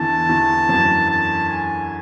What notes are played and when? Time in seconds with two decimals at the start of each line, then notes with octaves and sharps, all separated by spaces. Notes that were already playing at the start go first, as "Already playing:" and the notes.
Already playing: E2 D3 E3 A5
0.29 E2 E3
0.69 F#2 F#3
1.10 A5
1.49 G#5